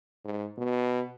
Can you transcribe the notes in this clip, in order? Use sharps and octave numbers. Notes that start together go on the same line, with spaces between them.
G#2
B2